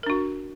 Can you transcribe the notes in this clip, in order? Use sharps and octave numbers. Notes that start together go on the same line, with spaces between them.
D4 F#4 A#4